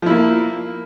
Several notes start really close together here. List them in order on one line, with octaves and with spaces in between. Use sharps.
F3 E4 A#3